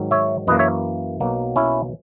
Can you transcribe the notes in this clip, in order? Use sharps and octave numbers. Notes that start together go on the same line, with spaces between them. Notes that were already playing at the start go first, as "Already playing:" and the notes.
Already playing: G#2 D#3 F#3
C#5 E5
F#2 E3 A#3 B4 D#5
C#5 E5
B1 B2 F#3 A#3
C#4 E4